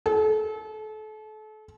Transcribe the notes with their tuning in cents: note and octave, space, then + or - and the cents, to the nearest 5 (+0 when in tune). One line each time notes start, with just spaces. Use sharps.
A4 -35